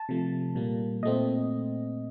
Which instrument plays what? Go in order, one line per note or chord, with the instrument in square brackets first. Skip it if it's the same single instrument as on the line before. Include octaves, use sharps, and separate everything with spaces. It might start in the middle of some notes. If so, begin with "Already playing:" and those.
Already playing: [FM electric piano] A5
C3 F3 A3
A#2 G3 A#3
A#2 A3 C4 D#5